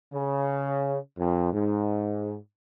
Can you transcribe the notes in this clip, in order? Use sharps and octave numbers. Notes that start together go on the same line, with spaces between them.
C#3
F2
G#2